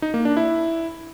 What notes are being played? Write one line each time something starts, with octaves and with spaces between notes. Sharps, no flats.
D#4
A#3
D4
E4